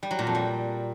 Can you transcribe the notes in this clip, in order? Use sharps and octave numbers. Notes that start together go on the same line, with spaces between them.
G3
F#3
A#2
F2
G3